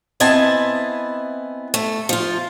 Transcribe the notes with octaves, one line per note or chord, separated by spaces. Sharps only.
B3 C4 E4 D#5 G#5 A5
A3
F3 F4